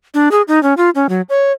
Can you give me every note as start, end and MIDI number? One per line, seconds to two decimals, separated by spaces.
0.14 0.29 62
0.32 0.42 68
0.48 0.62 63
0.63 0.74 61
0.77 0.90 65
0.95 1.07 61
1.09 1.21 54
1.29 1.52 73